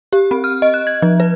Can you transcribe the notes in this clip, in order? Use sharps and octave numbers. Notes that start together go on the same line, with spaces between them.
G4
C4
F6
D#5
F#6
G#6
F3
B4